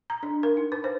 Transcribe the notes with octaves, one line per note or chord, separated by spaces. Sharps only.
A#5
D4
A#4
D#4
B4
C5